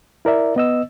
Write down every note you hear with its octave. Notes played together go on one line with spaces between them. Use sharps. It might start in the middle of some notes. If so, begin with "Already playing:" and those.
E4 A#4 D5 E5
B3 D#5 E6